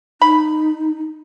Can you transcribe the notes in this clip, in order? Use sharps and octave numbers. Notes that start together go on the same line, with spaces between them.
D#4 B5